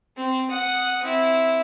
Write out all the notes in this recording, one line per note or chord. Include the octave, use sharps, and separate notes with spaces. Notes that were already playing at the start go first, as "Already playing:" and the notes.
C4
F#5 D#6
C4 E4